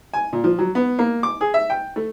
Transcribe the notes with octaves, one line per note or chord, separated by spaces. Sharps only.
G#5
A#2
F3
F#3
B3
A#3
D6
G#4
E5
G5
A3